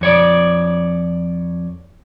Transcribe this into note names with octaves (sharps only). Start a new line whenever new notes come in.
F2 C#5 D5